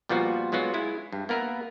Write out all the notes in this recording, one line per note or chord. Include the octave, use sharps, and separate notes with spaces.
A#2 F3 G3 B3 F4 F#4
F#3 G#3 B3 F4 F#4
G#3 E4
G2
A#3 B3 A#4 B4 E5